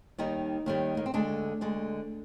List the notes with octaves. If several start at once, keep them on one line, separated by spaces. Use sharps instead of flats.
D#2 D#3 G3 D#4
D#2 D#3 G3
A#3
C4
D2 D3 G#3 D4
D2 D3 G#3